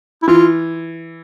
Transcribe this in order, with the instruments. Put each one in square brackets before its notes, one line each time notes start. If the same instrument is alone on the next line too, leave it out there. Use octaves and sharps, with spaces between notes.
[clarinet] E4
[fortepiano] E3 [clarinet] F4